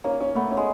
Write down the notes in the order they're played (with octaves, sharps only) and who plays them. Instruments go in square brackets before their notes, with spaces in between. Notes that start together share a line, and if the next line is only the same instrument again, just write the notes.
[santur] A#3 [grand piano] C#4
[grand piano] C#4
[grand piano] A3 [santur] B3
[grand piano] C#4
[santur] G#3